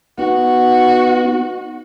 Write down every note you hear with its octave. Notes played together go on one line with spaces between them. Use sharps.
B3 D#4 F#4